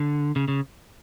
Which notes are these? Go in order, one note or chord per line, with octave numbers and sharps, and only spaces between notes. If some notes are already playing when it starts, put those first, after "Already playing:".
Already playing: D3
C#3
C#3